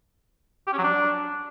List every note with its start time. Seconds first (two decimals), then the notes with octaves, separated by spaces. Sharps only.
0.67 G4
0.73 C#4
0.78 F#3
0.84 D4